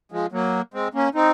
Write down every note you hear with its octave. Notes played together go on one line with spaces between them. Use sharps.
F3 G#3
F#3 A#3
G#3 C4
A#3 C#4
C4 D#4